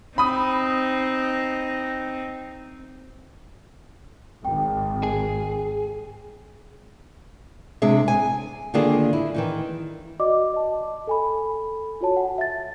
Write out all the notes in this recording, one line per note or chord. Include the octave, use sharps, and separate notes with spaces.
C4 D#4 B5 D#6
G#1 G5
G#4
C3 G#3 D4 G#4 E5
G#5
D3 D#3 A#3 D4 F4 G#4
E4
D#3 E3 D#4
F#4 D5 D#5 D6
D#5 A5
A4 G#5 B5
F4 F#4 C#5 A5
F#5 G#5
E5 A6